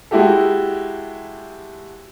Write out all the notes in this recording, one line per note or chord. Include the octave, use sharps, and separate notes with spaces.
G#3 E4 F#4 G4 A4